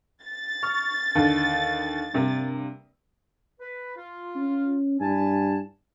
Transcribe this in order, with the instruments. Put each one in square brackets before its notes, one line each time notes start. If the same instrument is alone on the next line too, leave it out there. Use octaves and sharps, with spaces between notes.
[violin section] A6
[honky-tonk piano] C#6 F6
D#2 D3
G2 C3 A#3
[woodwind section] B4
F4
[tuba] C#4
[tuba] G2 [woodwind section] E4 G#5 A5